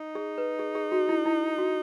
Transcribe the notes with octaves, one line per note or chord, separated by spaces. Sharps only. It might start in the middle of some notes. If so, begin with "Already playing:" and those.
Already playing: D#4
G#4
B4
G#4
G#4
F#4
E4
E4
F#4